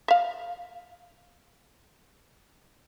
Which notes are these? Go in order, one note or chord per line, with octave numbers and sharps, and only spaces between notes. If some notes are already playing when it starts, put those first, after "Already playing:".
E5 F5